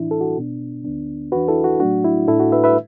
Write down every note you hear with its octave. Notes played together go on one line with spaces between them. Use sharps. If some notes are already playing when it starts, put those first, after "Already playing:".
Already playing: A2 E3 D4 E4
A4
F#4
B2 B3 D4
D2 D3 B3 D4
E2 E3 D4 F#4 B4
E4 A4
F#4
A2 F#3 A3 D4 F#4
E4
A2 A3 D4 E4 A4
F#4
B4 E5
B4 E5